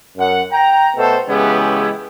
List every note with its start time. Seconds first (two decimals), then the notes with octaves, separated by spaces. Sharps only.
0.18 F#2 F#5
0.52 G5 A#5
0.97 B2 A3 B3 A4 C5
1.29 C#3 E3 G#3 B3 E4 G4